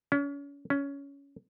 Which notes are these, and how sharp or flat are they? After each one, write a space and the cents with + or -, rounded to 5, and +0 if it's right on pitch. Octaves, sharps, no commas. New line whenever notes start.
C#4 +35
C#4 +15